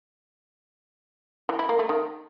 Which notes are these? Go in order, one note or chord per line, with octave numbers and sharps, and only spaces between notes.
E3
E4
A#3
A3
D#3